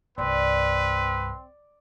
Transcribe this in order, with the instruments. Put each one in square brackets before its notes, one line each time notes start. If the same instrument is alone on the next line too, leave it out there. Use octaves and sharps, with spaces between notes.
[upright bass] C2 G2 [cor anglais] C4 [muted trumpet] B4 [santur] D5